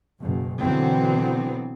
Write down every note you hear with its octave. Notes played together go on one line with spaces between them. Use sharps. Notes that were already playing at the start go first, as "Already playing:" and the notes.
F#1 B2
B2 D3 E3 F#3 B3 C4